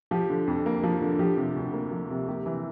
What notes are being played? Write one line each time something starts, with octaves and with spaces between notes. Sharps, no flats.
F3 G4
D3
F2
A#3
F3
D3
F3 G4
C3
D2
A#3
F3
C3
A#3 G4
E3